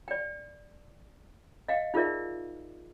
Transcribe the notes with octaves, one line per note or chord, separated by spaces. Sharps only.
D5 G5
D#5 F5 G5
D#4 F4 G#4 A#4 D5 E5